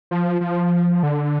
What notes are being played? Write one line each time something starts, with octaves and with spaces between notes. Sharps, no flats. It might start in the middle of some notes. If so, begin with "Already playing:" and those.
F3
F3
D3